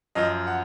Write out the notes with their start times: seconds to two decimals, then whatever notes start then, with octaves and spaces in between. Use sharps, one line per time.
0.15 F#2 F3 D#5
0.47 F#5